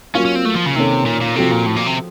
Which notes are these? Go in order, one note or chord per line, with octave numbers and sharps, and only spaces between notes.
F#3 A#3 C#4 F4
C#4
C4
A3
F3
C#3
C3 D#3 A#3 C#4 A4
A#2
A#2
C3 F3 C4 F#4 A4
A#2
A2
A#2
C3